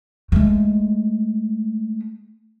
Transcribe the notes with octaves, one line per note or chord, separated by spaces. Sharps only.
G#3 A3